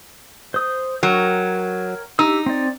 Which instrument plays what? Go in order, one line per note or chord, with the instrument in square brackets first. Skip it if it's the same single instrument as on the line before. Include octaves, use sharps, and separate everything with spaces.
[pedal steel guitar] C5 D#6
[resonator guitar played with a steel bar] F#3 [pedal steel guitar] A#4 C#5 G5
[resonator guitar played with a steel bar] D#4 [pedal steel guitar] G4 E6
[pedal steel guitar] C4 D5